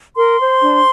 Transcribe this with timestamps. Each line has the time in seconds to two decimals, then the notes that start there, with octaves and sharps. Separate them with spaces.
0.16 A#4 C6
0.39 C5
0.62 D4